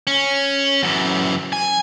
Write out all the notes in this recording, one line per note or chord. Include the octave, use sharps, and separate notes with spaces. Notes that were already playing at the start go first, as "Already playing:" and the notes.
C#4
F#2 E3
G#5